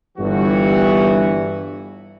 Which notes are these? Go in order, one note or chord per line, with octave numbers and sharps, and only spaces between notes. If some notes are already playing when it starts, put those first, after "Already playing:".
G1 G2 E3 F#4